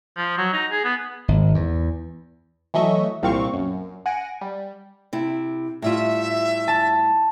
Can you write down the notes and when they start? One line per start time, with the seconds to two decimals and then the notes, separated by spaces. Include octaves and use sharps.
0.17 F3
0.37 F#3
0.53 D#4
0.71 G#4
0.84 B3
1.28 G#1
1.54 E2
2.74 E3 F#3 A3 D#5 E5 C#6
3.23 C2 A#2 C4 F5 C#6
3.53 F#2
4.06 F#5 G#5 A#6 D7
4.41 G3
5.13 C3 E4
5.82 A2 G3 F4 E5
6.68 A5